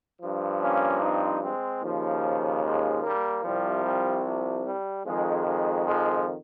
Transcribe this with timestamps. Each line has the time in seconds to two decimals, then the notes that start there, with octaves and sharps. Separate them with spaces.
0.20 G2 F3
0.61 A#3 C#4
1.01 C4 D#4
1.42 G#3 C4
1.82 D#2 C#3 F3
2.63 F3 G#3
3.03 G3 A#3
3.44 C2 C3 F3 G3
3.84 G3
4.24 F3
4.65 G3
5.05 F2 D#3 F3 G#3
5.45 F3 G#3
5.85 F3 G#3